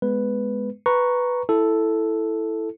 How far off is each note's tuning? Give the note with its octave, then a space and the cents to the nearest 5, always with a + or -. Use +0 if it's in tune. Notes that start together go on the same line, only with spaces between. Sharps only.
G#3 +0 B3 +0 B4 +0
B4 +0 A#5 +0 C#6 +0
E4 +0 A4 +0